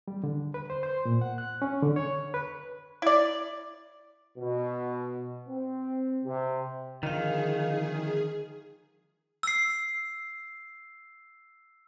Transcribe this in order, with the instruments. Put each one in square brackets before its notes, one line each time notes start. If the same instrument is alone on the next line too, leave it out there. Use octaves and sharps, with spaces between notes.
[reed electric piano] G3
D3
B4
C5
C5
A#2
F#5
F#6
C#4
D3
C#5
B4
[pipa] E4 D5
[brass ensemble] B2
C4
C3
[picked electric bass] D3 F3 [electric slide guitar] D#3 [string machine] G#4 [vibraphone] D#5 F5
[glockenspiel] E6 C7